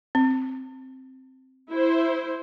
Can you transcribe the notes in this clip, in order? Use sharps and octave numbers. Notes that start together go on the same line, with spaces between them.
C4
E4 C5